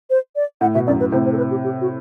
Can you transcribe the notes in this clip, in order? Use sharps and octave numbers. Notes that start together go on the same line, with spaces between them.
C5
D5
A2 F#5
B2 E5
F#2 A2 D5
B4
A2 C3 C5
C5
A4
B4
G4
G4
F#4